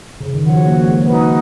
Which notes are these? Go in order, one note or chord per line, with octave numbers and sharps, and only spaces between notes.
C#3
D#3
F3 F#4 C#5 F#5
A#3
G#3
G#3
A#3 D#4 F#4 B4 F#5